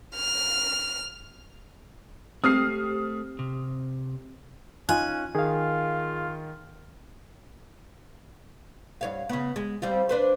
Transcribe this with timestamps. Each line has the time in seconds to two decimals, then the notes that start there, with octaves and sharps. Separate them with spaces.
0.15 F6
2.44 A3 C4 G4 D#6 F6 C7
3.39 C3
4.89 C#4 D#4 F4 G#5 F#6
5.35 D#3 F4 G#4 F5
9.01 G2 C#5 F5
9.29 C#3 B3
9.56 G#3
9.82 G3 C4 F4
10.09 D4 B4 C5